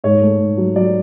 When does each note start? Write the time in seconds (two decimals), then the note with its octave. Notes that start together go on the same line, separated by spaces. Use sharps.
0.04 G#2 C#5
0.21 A3
0.40 G#2
0.57 F#3
0.76 F#3 D5